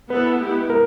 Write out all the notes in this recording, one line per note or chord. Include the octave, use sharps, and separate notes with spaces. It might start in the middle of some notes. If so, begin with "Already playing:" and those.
B3 E4 A4 B4
G#3 B3 E4 G4
A#4